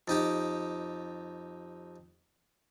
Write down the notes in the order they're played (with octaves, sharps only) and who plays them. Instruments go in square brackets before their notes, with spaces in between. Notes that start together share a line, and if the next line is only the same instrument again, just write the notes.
[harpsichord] F2 D#4 G4